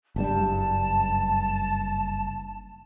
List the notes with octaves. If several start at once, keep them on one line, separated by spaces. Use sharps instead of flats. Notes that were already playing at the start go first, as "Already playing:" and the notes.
F#1 G2 G3 A5